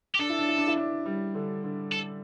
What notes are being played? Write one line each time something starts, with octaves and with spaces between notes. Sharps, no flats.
G4
D4 A4
E4
D4
E4
D4
E4
D4
G3
D3
D3
A4